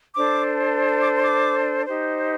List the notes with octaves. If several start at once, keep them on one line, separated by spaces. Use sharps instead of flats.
D4 A4 C5 D6
D6
C6
D6
D#4 G4 C5